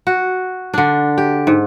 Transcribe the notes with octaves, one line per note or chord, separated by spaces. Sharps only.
F#4
D3 D4
G4
G#2